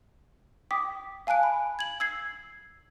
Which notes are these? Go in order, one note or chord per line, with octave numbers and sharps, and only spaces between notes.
G5 D6 D#6 B6
F5 G#5 A5 F#6 D7
B5
G#6 F#7
E6 G#6 C7